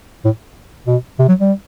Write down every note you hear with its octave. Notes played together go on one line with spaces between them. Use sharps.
A2
B2
C3
F#3
G3